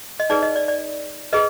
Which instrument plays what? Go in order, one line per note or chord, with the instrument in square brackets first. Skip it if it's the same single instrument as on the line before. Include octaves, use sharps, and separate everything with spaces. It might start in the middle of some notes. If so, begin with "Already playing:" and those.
[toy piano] D#5
D#4 G#4 B4 D5
D#5
D5
D5
G#4 B4 D#5